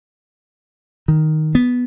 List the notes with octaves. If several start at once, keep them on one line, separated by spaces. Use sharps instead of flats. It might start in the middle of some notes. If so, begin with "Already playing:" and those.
D#3
B3